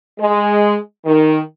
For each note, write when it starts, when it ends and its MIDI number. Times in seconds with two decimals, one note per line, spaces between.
0.20 0.75 56
1.05 1.38 51